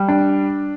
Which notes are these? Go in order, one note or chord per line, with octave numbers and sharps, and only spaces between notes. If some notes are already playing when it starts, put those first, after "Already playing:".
Already playing: G3
D4